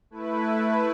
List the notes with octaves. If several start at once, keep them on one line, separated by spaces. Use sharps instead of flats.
A3 E4 B4